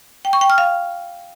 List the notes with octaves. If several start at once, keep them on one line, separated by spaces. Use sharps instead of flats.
G5
C#6
G5
F6
F5